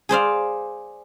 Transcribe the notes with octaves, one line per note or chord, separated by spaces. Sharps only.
G#4 C5 D5 F5